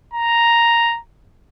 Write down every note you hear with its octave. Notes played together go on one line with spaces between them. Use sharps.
A#5